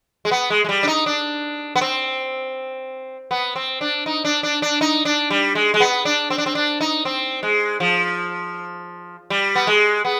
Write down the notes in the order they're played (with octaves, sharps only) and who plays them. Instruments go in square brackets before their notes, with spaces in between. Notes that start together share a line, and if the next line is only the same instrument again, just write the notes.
[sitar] G#3
B3
G#3
G#3
G3
D4
D#4
D4
B3
C4
B3
C4
D4
D#4
D4
D4
D4
D#4
D4
G3
G#3
G#3
B3
D4
C4
D4
C4
D4
D#4
C4
G#3
F3
G3
B3
G#3
B3